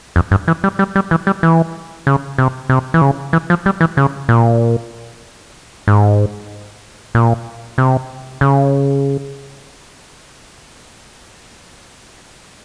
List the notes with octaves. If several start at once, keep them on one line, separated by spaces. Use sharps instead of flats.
F2
G2
E3
G3
G3
G3
E3
G3
E3
C#3
C3
C3
E3
C#3
E3
F3
G3
E3
C#3
A#2
G#2
A#2
C3
C#3